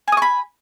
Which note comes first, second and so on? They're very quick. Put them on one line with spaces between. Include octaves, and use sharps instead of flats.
G#5 D#6 C#6 B5